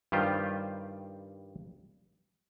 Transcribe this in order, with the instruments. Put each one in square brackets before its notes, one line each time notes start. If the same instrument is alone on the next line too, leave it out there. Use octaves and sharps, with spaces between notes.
[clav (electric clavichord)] G2 D#3 G3 F4 G4 C5